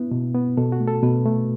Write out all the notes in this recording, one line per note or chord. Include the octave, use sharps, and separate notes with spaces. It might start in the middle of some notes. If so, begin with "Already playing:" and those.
Already playing: B3 E4
B2
B3
B2 A4
F#4
A3
A4
B2 B4
A3